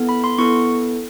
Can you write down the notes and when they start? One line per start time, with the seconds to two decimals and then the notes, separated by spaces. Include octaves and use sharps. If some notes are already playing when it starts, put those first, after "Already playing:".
Already playing: B3 E4 A4
0.09 B5
0.24 C6
0.38 B3 E4 A4 C#6